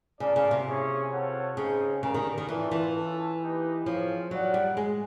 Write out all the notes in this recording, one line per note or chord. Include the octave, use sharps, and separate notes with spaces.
C#3 D4 F4 A#4 D5
C#3
C3
A#3 C#4 E4 G#4 C#5
C4 F4 A4 C#5 F#5
C#3 C4 D#4 G#4
C#3 B3 D4 G4 A#4
D#3
D#3
E3 A3 C4 F4 A4 D5
E3
C#4 F4 A4
A#3 D#4 G4 B4 D#5
F3 C4 F4 G#4 C#5 F5
F#3 D#4 G4 A#4 D5 F#5
G3
G#3